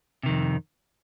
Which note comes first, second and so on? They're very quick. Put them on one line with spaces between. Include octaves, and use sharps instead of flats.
C3 D#3 F2